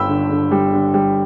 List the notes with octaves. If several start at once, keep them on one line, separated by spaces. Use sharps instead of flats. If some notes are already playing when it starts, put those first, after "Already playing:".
Already playing: G1 G2 G3 G5 B5 E6
D3
D3
G3
D3
G3